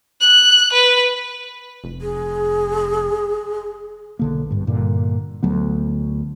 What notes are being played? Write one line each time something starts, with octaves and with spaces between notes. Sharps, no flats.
F#6
B4
F1
G#4
B1 D3 A#3
G#1 G2
G2 A#2 D3
D2 F#3 B3